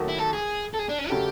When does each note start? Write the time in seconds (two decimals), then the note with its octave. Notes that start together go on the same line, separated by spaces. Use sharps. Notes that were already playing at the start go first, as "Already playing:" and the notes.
Already playing: D#2 D#3 F#3 A3
0.08 E4
0.18 A4
0.33 G#4
0.74 A4
0.79 G#4
0.89 D4
0.99 C#4
1.09 C#3 F#3 A3 G4